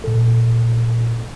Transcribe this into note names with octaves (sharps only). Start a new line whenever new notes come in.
A#2 A4